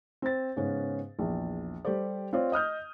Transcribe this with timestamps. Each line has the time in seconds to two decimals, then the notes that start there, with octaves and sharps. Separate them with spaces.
0.22 C4 A6
0.56 G#2 C#3 B3 C#4
1.19 A#1 E2
1.85 G3 G4 A4 C5 D5
2.33 C4 F4 C#5 D5
2.52 D#5 D#6 F6 G6